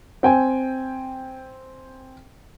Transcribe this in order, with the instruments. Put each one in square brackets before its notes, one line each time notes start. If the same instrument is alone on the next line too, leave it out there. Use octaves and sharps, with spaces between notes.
[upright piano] C4 G5 G#5